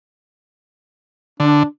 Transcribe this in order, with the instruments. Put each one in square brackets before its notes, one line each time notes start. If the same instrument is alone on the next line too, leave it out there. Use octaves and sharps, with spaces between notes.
[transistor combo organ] D3 [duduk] D4